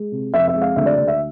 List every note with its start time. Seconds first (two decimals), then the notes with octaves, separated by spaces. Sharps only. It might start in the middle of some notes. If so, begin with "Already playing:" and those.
Already playing: G#3
0.12 C3
0.34 F2 E5
0.48 E5
0.54 G#3
0.61 F5
0.76 D2 E5
0.86 D5
0.97 D2 D5
1.08 E5